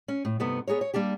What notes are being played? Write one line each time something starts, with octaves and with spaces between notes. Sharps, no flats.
C#4
A2
G2 C3 A3 B3 D#4
B3 G#4 A#4 C#5
C#5
G3 A#3 D4 G4